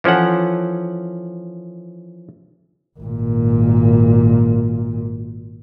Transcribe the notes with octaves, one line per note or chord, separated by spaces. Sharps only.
E3 F3 C#4 A4 F#5
G#1 A#2